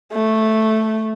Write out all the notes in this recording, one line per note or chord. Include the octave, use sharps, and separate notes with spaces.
A3